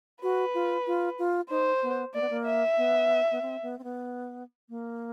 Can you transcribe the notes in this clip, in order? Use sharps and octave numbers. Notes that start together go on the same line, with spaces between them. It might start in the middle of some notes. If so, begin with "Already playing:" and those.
F#4 B4
F4
F4
F4
D#4 C5
B3
A#3 D5
B3
A#3
E5
B3
B3
C4
B3
C4
B3
A#3